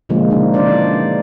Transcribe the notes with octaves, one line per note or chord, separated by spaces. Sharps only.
B2 D3 F3 G#3 A#3
C#3 D4 D#4
C#3 E3 D4 C5 D5